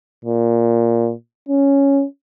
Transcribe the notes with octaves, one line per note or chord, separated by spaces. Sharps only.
A#2
C#4